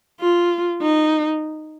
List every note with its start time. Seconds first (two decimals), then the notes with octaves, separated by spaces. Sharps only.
0.20 F4
0.82 D#4